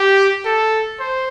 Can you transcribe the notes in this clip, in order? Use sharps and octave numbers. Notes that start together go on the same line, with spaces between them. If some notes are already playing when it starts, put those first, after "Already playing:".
Already playing: G4
A4
C5